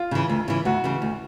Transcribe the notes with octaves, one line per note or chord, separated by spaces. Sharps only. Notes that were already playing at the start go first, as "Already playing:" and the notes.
Already playing: F4
C#3 E3
D2
C#3 E3
D2 F#4
C#3 E3
D2